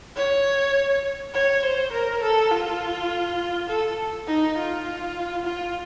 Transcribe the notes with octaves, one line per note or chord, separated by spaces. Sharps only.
C#5
C#5
C5
A#4
A4
F4
A4
D#4
F4
F4